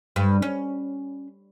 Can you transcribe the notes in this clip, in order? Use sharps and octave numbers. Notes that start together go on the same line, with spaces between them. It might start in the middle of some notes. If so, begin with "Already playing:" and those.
G2
C#4